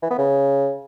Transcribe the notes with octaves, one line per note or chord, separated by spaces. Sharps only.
E3
B3
C#3